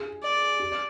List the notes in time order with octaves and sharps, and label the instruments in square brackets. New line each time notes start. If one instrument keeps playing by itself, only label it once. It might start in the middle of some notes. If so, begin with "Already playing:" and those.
Already playing: [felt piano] G#4
[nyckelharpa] D5
[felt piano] G4